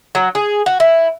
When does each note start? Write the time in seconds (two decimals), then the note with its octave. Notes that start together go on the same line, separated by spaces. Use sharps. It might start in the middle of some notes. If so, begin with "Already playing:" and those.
0.15 F#3
0.35 G#4
0.66 F#4
0.80 E4